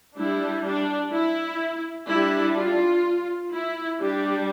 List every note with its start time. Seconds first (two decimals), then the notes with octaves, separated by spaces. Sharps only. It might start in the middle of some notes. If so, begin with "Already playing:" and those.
0.17 G3 D4 E4
0.64 D4
1.12 E4
2.09 G3 D4 E4
2.56 F4
3.53 E4
4.00 G3 D4 G4